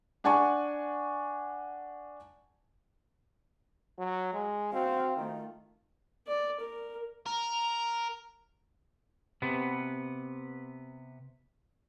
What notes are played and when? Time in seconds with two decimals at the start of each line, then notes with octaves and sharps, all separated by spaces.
0.24 D4 F#5 G#5 A5 C#6
3.99 F#3
4.34 G#3
4.73 C4 F#4 F5
5.17 D#3 A3 F4
6.28 D5
6.60 A#4
7.26 A#4
9.42 C3 B3